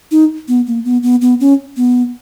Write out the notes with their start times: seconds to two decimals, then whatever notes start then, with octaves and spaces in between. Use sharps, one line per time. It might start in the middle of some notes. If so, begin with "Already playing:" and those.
0.11 D#4
0.48 B3
0.67 A#3
0.85 B3
1.03 B3
1.21 B3
1.40 C#4
1.77 B3